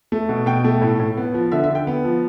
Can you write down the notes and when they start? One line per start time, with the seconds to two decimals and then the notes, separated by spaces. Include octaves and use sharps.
0.12 A3
0.29 B2
0.46 B2 G5
0.64 A3
0.82 A2
1.00 A2
1.17 B3
1.34 F3
1.52 D3 E5
1.64 E5
1.70 D3
1.75 G5
1.87 B3
2.04 F3